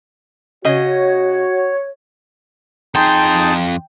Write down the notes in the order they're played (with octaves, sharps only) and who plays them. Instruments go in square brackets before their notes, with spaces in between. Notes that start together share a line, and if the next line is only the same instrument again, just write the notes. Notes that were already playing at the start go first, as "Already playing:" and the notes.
[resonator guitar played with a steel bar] C#3 D#5 [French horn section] F#4 [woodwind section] C#5
[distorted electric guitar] F2 C6 [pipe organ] D#4 G#4 A5 [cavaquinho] G5